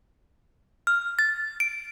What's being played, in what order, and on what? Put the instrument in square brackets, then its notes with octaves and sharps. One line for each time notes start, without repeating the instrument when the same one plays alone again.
[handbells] F6
A6
D7